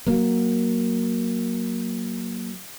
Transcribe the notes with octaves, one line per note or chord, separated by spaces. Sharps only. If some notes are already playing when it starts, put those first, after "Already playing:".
F#3 A#3